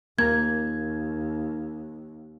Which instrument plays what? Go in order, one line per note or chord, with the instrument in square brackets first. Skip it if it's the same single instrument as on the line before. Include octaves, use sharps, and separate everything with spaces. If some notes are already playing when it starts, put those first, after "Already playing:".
[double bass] D#2 [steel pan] A#3 A#5 [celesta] G#6